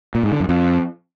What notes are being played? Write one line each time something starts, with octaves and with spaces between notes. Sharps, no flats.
A#2
G#2
D3
F#2
F2